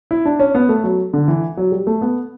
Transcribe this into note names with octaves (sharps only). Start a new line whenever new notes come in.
E4
D4
C#4
B3
A3
F#3
D3
E3
F#3
G3
A3
B3